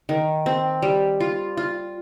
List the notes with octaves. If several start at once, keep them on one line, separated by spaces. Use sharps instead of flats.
D#3
C4
G3
F4
F4